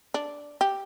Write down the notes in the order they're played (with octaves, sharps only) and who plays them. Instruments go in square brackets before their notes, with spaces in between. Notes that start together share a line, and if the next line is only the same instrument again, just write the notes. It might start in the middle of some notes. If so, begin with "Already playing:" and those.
[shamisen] D4
G4